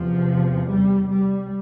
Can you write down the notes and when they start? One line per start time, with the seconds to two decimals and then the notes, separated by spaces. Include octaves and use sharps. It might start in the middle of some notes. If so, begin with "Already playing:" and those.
Already playing: E2 C3 F3
0.69 G3
1.09 G3